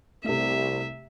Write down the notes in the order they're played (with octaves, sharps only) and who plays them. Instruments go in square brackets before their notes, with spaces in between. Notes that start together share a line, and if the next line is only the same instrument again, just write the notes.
[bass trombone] C2 [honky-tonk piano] C3 A3 [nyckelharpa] E5